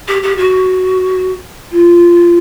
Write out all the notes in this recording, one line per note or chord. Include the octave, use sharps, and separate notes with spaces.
G4
G4
F#4
F4